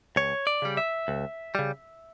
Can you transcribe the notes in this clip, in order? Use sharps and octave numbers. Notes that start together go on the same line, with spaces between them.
C#2 C#5
D5
C#3 G3
E5
C#2
C#3 G3